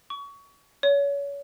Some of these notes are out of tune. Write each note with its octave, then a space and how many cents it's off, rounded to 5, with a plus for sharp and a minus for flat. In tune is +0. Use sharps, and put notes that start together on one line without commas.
C#6 +25
C#5 +30